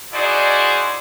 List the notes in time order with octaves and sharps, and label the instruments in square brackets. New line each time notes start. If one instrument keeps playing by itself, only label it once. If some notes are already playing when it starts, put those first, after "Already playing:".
[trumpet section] D#4 E4 F#4 G#4 C5 D5